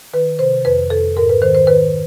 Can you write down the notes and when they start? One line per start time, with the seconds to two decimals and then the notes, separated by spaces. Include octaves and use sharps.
0.14 D#3 B4
0.39 C3 C5
0.65 F2 B4
0.90 F2 A4
1.17 G#2 A#4
1.29 B4
1.42 D#3 C5
1.55 C5
1.67 D#3 B4